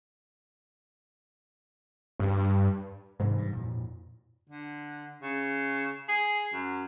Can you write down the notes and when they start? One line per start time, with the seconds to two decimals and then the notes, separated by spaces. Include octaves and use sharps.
2.20 G2
3.20 G#2 C3 E3 G#3
3.38 G2
3.53 F2 A#2
4.49 D3
5.23 C#3
6.09 G#4
6.54 F#2